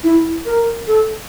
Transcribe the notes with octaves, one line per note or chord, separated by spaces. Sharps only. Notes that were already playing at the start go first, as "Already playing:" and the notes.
E4
A#4
A4